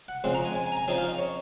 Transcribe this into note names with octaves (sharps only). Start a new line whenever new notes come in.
F#5
F2 C#3 G#3 C4
A#5
G#5
G#5
G#5
A#5
G#5
C#3 F3 C4 D#4 G#5
F5
D#5
C#5